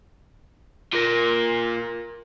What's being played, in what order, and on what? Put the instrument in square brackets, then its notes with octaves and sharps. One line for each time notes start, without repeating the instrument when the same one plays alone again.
[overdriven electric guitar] A#2 [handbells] F4 A#4 A#6